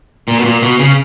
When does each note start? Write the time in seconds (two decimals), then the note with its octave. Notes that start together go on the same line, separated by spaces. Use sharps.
0.28 A#2
0.39 B2
0.45 A#2
0.62 B2
0.79 C#3